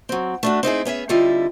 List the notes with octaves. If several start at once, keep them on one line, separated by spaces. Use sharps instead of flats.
F#3 C4
A3 D4 F#4
C4 D#4 E4 G#4
B3 C#4 G#4 E5
D3 G3 C4 E4 F4 D#5